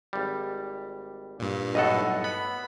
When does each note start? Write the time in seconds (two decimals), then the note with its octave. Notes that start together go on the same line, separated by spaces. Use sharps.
0.13 G#1 G3
1.40 G2 A#2
1.75 B1 A2 A4 D#5 F#5
2.24 B3 B5